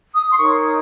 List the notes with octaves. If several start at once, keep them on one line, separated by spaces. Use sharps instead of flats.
D#6
C6
D#4 A#4 C#5 C#6